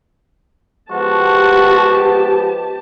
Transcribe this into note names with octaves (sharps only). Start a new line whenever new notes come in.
F3 G#3 B3 F#4 G4 A5